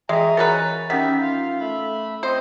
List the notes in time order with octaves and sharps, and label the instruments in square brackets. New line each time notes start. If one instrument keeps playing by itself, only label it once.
[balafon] E3 G5 [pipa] G#3 [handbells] G#4 D#5 E5 [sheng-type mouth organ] G#5 A#5
[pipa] F#3 C#4 B4 [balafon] A#4 [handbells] A6
[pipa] D#3 [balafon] C#4 F#5 [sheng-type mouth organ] G4 E5 [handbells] B6
[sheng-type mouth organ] F4 F5
A3 E5 B5
[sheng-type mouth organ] C4 D#5 [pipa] C5